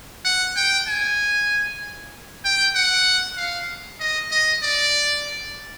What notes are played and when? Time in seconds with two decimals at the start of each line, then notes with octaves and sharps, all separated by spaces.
0.25 F#5
0.57 G5
0.88 G#5
2.44 G5
2.75 F#5
3.37 F5
4.00 D#5
4.31 D#5
4.63 D5